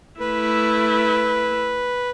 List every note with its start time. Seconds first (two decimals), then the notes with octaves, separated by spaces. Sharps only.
0.20 A3 E4 B4